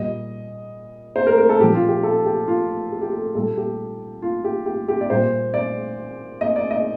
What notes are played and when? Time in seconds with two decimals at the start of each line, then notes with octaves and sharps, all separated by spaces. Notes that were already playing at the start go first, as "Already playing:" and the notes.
Already playing: A#2 G3 D#5
1.16 C5
1.27 A#4
1.38 A#4
1.49 A4
1.60 A#2 F3 G4
1.75 F4
1.89 G4
2.03 A4
2.25 G4
2.47 F4
2.91 G4
3.02 G4
3.13 A4
3.35 A#2 G3 A4
3.57 G4
4.22 F4
4.44 G4
4.66 G4
4.88 G4
5.01 D5
5.10 A#2 G3 C5
5.54 D5
6.41 D#5
6.56 D5
6.71 D#5